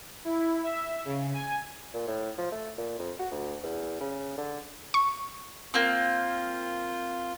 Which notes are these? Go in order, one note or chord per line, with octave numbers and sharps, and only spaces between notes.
E4
E5
C#3
G#5
A#2
A2
F3
A3
A#2
F2
F#4
D2
E2
C#3
D3
C#6
A#3 C4 F4